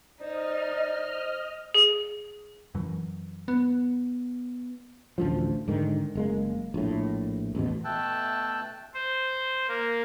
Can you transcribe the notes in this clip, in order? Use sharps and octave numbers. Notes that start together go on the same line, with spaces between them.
D#4 C5 D5 D#5 F6
G#4
F#2 E3 F#3
B3
A1 D2 F3
G#2 D3 D#3
F#1 G#3 A#3
A#1 A2
A1 E2 B2
B2 A3 G5 A5 E6 F#6
C5
A#3